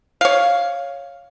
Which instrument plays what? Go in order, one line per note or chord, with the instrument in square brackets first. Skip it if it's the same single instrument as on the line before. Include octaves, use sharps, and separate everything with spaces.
[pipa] C#5 F5